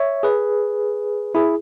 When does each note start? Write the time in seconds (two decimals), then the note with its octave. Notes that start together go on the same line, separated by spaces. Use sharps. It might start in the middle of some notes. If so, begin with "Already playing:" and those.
Already playing: C#5 E5
0.23 G#4 B4
1.35 E4 G#4